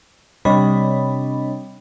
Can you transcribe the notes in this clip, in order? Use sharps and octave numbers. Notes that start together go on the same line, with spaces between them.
C3 G3 D4 C#5 D#5 B5